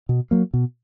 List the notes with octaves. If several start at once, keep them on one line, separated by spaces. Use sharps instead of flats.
B2
F#3 A#3
B2